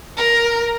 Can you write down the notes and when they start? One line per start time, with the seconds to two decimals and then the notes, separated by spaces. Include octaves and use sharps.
0.17 A#4